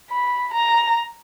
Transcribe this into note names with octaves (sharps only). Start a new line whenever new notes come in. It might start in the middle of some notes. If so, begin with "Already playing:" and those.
B5
A#5